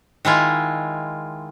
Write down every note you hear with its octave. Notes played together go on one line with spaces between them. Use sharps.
D#3 G#3 E4 F4